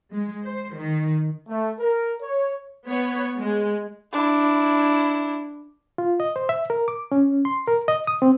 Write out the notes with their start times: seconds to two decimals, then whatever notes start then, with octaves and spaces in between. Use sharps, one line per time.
0.13 G#3
0.45 C5
0.76 D#3
1.47 A3
1.79 A#4
2.22 C#5
2.88 B3 C#5
3.38 G#3
4.13 D4 E4
5.98 F4
6.20 D#5
6.36 C5
6.49 E5
6.70 A#4
6.88 D6
7.12 C#4
7.45 C6
7.68 A#4
7.88 D#5
8.07 D#6
8.22 C4